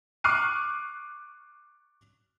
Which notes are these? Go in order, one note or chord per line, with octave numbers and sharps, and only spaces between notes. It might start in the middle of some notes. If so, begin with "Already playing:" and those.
C#6 D6 F6 F#6 C7 D#7